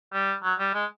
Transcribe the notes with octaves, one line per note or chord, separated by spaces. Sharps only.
G3
F#3
G3
G#3